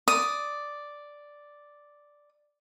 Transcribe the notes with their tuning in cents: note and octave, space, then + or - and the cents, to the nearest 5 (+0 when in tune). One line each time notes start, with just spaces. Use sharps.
D5 +0 D#6 +0